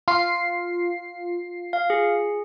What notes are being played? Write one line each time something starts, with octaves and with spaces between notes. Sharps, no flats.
F4 C7
F5
G#4